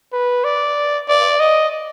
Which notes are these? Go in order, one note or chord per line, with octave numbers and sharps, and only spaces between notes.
B4
D5
D5
D#5